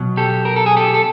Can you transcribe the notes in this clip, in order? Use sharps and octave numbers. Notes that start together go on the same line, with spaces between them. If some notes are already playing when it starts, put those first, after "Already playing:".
Already playing: B2 F#3
G4 A4
A#4
A4
G#4
G4 A4
A4